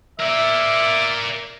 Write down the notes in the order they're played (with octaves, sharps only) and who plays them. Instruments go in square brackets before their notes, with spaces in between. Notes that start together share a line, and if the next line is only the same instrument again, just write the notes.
[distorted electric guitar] A#4 D5 [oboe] E5